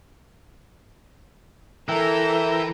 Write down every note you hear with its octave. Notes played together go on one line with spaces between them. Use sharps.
E3 A4 A#4 E5 G5 A#5